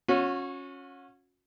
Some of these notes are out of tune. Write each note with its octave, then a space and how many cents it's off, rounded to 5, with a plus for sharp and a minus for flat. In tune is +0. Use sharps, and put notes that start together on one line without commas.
C#4 -10 F#4 -40